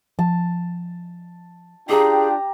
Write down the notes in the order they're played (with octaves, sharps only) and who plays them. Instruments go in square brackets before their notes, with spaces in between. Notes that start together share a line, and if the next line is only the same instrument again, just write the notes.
[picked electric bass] F3 [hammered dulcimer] A5
[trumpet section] D4 F4 G5 [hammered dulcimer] G4 A#5 [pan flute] G#4